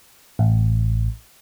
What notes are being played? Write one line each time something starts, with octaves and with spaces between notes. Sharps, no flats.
A1